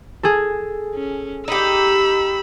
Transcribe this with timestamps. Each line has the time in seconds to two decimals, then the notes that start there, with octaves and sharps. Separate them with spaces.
0.23 G#4 A4
0.95 C#4
1.48 D#4 G4 B5 E6